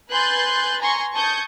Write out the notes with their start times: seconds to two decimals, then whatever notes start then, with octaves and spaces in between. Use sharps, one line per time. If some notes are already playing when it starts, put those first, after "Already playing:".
0.10 B4 G#5 C6 F#6 G6 A6
0.80 G#5 A#5 C6 C#6
1.14 A5 C#6 D#6 G6 G#6